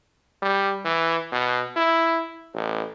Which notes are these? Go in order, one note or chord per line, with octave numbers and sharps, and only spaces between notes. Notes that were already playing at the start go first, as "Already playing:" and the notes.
G3
E3
B2
E4
A1